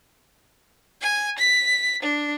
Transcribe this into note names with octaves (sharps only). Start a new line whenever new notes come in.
G#5
B6
D4